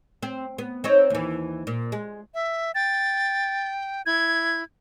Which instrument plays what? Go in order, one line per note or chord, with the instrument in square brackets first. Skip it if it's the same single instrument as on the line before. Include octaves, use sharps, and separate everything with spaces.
[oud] C4
B3
C4 D#4 C#5
D#2 E3
A#2
G#3
[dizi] E5
[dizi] G5 [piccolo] A6
[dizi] E4 [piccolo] G#6